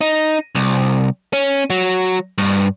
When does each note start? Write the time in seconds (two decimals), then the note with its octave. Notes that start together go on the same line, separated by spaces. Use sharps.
0.01 D#4
0.55 C2
1.33 C#4
1.70 F#3
2.38 G2